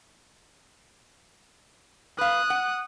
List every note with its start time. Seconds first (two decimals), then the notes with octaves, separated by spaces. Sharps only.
2.18 B4 F5 D#6 F#6
2.50 F#5